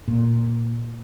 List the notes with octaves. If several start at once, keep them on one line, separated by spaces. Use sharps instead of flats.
A#2